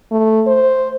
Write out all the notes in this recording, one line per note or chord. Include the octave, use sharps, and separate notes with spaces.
A3
C5